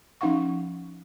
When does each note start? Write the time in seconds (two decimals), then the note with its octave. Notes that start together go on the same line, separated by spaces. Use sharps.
0.21 F3 C#4 D#4 F5 F#5 C#6